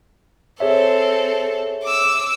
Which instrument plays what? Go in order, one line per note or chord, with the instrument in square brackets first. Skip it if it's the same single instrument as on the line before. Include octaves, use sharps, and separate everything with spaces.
[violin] C4 A4 [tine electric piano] G#4 C#5 E5
[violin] D6 E6